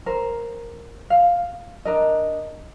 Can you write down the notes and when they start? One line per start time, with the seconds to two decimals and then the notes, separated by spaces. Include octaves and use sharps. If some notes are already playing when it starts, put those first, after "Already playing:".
0.06 A#4 C5
1.10 F5
1.85 D4 A#4 D#5